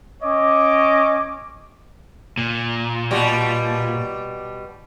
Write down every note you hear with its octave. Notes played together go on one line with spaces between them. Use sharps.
C#4 C#5 D#5 D6
A#2
B2 G3